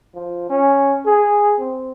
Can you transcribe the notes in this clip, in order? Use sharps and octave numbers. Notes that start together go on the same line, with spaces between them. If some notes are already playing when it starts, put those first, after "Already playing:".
F3
C#4
G#4
C4